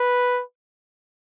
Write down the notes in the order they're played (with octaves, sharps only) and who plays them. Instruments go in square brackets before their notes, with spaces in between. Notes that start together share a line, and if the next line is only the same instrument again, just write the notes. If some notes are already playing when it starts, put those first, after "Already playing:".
Already playing: [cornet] B4